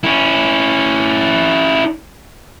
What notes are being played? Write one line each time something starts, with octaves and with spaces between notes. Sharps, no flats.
C#4 E4